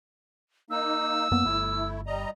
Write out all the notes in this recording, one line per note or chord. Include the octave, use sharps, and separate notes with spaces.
A#3 D#4 E6
F#2 A#3 B3
G1 A3 E4
G3 D#5 A#5